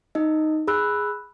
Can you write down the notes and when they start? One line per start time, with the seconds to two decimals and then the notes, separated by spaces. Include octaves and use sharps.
0.15 D#4 D#5
0.67 G#4 B5 E6 F#6